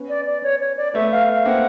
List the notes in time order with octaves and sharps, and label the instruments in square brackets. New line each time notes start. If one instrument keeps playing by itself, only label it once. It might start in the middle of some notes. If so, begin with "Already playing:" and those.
Already playing: [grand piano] B3 C#4
[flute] D5
D5
C#5
C#5
D5
[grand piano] A3 B3 [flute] E5
[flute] F5
F5
[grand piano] A#3 C4 [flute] F#5